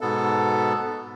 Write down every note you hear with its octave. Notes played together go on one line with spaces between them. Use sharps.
G#2 B2 B3 A4